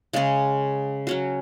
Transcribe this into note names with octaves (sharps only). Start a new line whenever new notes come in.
C#3 G#3 C#4 G#4
F#3 C#4 F#4